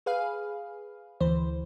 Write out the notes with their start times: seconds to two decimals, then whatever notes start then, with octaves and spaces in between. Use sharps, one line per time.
0.06 G#4 B4 F5
1.20 D2 E3 C5